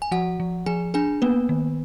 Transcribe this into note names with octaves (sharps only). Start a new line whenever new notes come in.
G#5
F3 F#4 F#5
F3
F3 G#4 G#5
D4 G#4 G#5
A#3 B3 B4
D#3